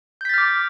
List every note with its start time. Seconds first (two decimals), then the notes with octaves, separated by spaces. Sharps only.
0.21 G6
0.25 B6
0.29 A6
0.34 F6
0.38 D6